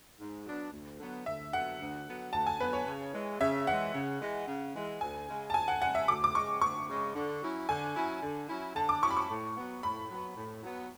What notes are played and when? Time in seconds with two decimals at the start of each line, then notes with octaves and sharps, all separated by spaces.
0.19 G#2
0.46 F#3 B3 D4
0.72 D2
0.99 D3 F#3 B3
1.26 D2 E5
1.53 D3 F#3 B3 F#5
1.80 D2
2.06 D3 F#3 B3
2.33 D2 A5
2.47 G#5
2.60 D3 F#3 B3 B4
2.73 C#5
2.86 C#3
3.13 E3 G#3
3.40 C#3 E5
3.67 E3 G#3 F#5
3.94 C#3
4.21 E3 G#3
4.47 C#3
4.75 E3 G#3
5.01 D2 G#5
5.28 C#3 G#3
5.50 A5
5.54 D2 G#5
5.68 F#5
5.82 C#3 G#3 F#5
5.95 E5
6.08 D2 D6
6.24 D6
6.35 C#3 G#3 C#6
6.62 D2 C#6
6.89 C#3 G#3
7.15 D3
7.42 F#3 C#4 E4
7.69 D3 G#5
7.95 F#3 C#4 E4
8.22 D3
8.49 F#3 C#4 E4
8.75 D3 A5
8.89 D6
9.03 F#3 C#4 E4 C#6
9.11 B5
9.17 C#6
9.30 A2
9.56 F#3 B3
9.83 A2 B5
10.10 F#3 B3
10.37 A2
10.63 F#3 B3